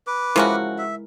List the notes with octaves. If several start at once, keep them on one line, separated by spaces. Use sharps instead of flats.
B4 D6
F3 G#3 C#4 E4 F#4 A#4
E5